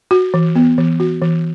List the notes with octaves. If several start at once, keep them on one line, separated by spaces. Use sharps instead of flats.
F#4
E3
B3
E3
F#4
E3